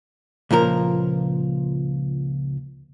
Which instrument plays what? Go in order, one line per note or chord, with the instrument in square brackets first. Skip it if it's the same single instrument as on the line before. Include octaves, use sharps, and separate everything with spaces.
[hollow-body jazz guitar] C#2 A#2 F3 A#4